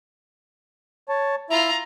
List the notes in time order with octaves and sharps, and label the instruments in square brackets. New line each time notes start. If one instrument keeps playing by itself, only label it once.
[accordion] C#5 A5
[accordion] E4 E5 [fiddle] F4 A#5